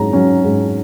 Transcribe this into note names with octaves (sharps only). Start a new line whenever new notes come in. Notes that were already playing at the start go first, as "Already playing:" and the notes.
Already playing: G#2 F#3 C#4 A#5
F#3 C#4
G#2